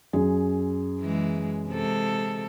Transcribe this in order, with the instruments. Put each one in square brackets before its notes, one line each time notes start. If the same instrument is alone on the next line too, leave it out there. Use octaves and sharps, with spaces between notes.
[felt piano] F#2 G#4
[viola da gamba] E3 G#3
C3 G#3 A4